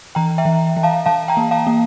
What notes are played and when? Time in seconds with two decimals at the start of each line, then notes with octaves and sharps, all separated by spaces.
0.15 E3 G5 A#5
0.38 E5 G5
0.45 E3
0.77 E3
0.83 F5 A5
1.06 E3 F5 A5
1.28 G5 A#5
1.37 A#3
1.51 F5 A5
1.67 A#3